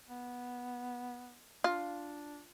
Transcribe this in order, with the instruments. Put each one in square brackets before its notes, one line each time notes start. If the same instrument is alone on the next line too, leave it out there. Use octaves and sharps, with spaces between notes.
[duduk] B3
[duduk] D4 [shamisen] F4